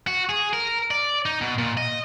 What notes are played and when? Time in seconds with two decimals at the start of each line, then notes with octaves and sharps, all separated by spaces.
0.07 F#4
0.29 G#4
0.53 A#4
0.91 D5
1.26 D#4
1.41 B2
1.58 A#2
1.77 D#5